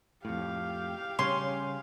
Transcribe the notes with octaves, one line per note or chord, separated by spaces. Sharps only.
F2 A2 G4 F5
C#3 G3 C#4 C6